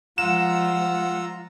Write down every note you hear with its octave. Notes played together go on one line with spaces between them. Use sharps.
F3 G3 G#3 F4 F#5 A#5 E6 E7